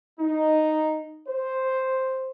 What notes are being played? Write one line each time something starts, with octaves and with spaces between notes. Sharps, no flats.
D#4
C5